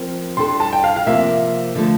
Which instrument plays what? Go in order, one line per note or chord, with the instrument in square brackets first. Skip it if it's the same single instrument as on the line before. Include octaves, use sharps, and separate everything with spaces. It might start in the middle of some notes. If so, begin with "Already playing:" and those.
Already playing: [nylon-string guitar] F3 C4 A#4
[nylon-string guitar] G3 D4 A4 [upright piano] C6
[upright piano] A5
G5
F5
F5
[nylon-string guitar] C3 F3 A#3 [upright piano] E5
[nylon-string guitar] D3 F3 A3